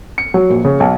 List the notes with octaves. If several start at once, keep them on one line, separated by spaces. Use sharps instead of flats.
C#7
F#3
A#1
C#3
B1